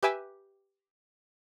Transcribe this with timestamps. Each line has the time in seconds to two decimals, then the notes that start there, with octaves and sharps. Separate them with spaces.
0.03 G4 B4 E5 G#5 D6 E6